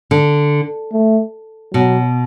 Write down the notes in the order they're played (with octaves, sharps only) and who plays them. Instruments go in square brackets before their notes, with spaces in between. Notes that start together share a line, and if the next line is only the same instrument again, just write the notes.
[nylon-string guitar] D3
[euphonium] A3
[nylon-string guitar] B2 [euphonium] F#3